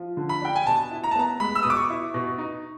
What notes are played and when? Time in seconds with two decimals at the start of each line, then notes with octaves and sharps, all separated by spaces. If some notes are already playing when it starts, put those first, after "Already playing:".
Already playing: F3
0.17 D3
0.29 B5
0.42 D4 G5
0.55 G#5
0.66 B2 A5
0.91 E4
1.04 A#5
1.11 A5
1.16 B3 A#5
1.40 G#3 B5
1.55 E6
1.63 B2 D#6
1.70 D6
1.77 C#6
1.90 E4
2.14 B2
2.38 D#4